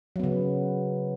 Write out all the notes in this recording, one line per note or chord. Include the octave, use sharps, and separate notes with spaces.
C#3 F#3 B3